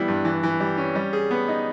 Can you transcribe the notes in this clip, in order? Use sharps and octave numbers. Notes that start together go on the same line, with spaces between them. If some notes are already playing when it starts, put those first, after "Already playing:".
Already playing: E3 G3 B3 E4
G2
E3
E3
G3
C#4
G3
G#4
B3
D#4